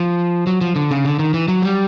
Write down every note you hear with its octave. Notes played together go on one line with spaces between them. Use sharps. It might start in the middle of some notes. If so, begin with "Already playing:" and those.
Already playing: F3
F#3
F3
D3
C#3
D3
D#3
E3
F#3
G3